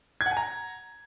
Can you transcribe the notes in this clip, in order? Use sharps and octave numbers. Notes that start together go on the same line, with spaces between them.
G#6
F#5
G#5
A#5